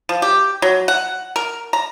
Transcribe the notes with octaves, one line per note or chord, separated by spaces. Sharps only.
F3
G4
F#3
F#5
A#4
A#5